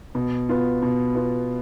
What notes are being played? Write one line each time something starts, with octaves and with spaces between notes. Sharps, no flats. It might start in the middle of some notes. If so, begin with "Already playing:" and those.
B2
B3 F4
B2
B3 F4